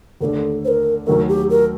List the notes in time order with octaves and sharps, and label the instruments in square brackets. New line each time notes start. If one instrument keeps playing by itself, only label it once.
[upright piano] D#2 D3 A3 D4 [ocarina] A4 A#4
[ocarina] C5
A#4
[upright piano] D#2 D#3 F#3 A3 [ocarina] A#4
[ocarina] G4
A#4